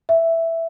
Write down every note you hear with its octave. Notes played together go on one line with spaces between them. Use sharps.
E5